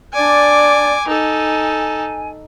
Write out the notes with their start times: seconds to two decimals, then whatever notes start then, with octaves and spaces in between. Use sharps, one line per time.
0.13 D4 D5 G#5 D6
1.08 D#4 A4 G#5